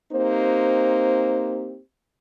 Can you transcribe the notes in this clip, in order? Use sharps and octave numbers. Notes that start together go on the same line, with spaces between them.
A#3 C4 D#4 G4 C5